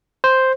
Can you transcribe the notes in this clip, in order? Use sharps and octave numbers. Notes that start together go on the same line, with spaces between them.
C5